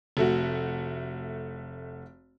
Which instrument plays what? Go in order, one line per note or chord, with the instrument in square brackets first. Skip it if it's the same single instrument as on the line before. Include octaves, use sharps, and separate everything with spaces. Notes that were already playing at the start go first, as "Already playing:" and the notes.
[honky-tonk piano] F1 A3 F#4